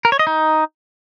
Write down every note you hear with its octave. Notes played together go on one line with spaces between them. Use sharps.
A#4
C#5
D#5
D#4